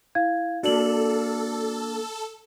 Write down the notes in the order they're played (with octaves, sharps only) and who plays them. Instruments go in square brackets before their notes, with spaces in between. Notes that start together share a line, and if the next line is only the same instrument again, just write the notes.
[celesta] E4 F5 G#6
[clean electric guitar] A#3 D4 [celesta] F#4 D5 F#7 [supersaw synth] A4